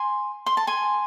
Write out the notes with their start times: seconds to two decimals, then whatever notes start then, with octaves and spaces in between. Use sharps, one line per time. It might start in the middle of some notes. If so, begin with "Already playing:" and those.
Already playing: G#5 C6
0.46 C6
0.57 A5
0.67 G#5 C6